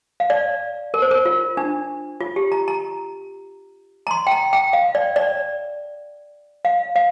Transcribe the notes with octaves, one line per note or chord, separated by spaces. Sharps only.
F5
D5
A#4
C5
A#4
F4
D4
F4
G4
A#5
A#5
A#5
C6
G5
A#5
G5
F5
D5
D5
F5
F5